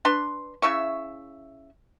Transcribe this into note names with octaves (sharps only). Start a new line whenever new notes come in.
D4 B4 C6
C#3 E4 E5 C#6